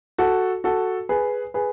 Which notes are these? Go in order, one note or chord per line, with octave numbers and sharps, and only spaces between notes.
F#4 A4
F#4 A4
G#4 B4
G#4 B4